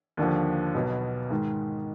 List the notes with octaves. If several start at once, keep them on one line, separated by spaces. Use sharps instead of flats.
D#2 D3 F3
B1 B2 B3
G#2 D#3 G#3